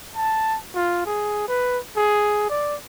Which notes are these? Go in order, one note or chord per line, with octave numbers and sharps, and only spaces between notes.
A5
F4
G#4
B4
G#4
D5